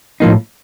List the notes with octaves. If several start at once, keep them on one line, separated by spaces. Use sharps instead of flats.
A2 F3 A#3 D#4